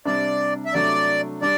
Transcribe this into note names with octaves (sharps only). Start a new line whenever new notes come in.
C3 G3 D4 D5
E5
C3 F#3 A3 D4 D5
G3 D4 D5